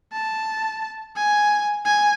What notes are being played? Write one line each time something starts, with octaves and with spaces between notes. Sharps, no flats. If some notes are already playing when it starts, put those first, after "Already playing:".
A5
G#5
G#5